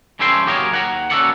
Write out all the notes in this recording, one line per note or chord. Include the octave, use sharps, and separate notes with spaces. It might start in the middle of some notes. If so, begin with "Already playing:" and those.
G2 E3 C#4 A4 G5 C6
F#3 A#3 G4 G#4 A#4 C#5
D#2 F#5 A#5
A#3 C#4 F#4 A4 D5 F#5